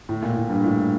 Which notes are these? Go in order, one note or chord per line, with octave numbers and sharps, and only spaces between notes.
A2
A#2
A2
G2
A2